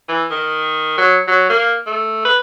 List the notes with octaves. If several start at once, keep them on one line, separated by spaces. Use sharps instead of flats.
E3
D#3
F#3
F#3
A#3
A3
B4